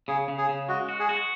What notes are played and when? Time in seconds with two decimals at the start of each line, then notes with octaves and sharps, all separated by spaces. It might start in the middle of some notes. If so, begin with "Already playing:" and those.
0.08 C#3 G#4
0.28 C#3
0.38 G#4
0.49 C#3
0.69 G#3 F#4
0.89 F#4
1.00 G#4
1.09 F#4